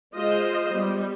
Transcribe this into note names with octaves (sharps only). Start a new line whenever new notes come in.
G#3 F4 C5 D#5
G3 B3